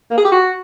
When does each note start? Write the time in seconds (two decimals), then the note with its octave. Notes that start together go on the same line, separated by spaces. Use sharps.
0.11 A#3
0.18 G#4
0.25 G4
0.32 F#4